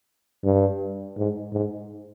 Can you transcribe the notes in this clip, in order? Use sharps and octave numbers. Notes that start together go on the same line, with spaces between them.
G2
G#2
G#2